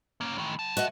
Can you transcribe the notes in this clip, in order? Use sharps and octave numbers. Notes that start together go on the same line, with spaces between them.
A#3 C#4
A2 D#3
F#3 A5
F#4 D#5 F#5